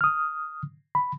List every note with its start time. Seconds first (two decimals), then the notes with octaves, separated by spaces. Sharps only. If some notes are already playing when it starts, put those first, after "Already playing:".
0.01 D#6 F6
0.95 B5